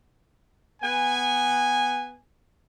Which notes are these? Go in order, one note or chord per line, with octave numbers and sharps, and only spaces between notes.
B3 G#5